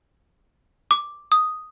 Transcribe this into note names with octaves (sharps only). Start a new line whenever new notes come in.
D6
D#6